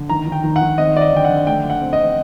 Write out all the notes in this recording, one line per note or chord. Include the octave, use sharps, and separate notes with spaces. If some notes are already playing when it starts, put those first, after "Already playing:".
Already playing: D3
D#3 A#5
D#3
G5
D#3
F#5
D#3
C4 D#5
C4 D5
D#5
D3 G5
F#5
D3
A3 G5
D3
F#5
C4
D#5
C4